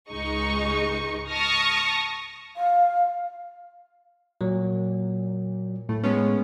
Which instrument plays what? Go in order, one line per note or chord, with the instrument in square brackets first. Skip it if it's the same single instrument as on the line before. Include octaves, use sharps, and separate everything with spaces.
[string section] C#2 G#2 G#3 D#4 C#6
A5 C#6 D#6 F6 A#6
[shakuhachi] F5
[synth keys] A#2 [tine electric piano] F#3
[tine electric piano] A2 [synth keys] A3
[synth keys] G#3 B3 C#4